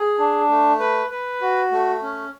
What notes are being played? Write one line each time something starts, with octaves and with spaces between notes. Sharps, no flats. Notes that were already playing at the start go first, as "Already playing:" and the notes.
Already playing: G#4
D4
A3
B4
B4
F#4
A3
C#4